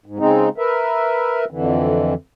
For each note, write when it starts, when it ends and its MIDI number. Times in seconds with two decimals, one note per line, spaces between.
0.06 0.19 44
0.19 0.49 49
0.19 0.49 56
0.19 0.49 60
0.19 0.49 63
0.58 1.45 70
0.58 1.45 71
0.58 1.45 76
1.51 2.14 41
1.51 2.14 50
1.51 2.14 52